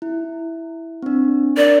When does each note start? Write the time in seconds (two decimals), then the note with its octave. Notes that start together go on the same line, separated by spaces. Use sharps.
0.02 E4
1.03 C4 D4
1.57 D4 A#4 D5